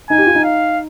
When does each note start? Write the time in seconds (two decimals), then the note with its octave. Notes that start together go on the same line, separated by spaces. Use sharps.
0.10 D#4 G#5
0.18 G4
0.27 F4
0.35 D#4
0.44 F5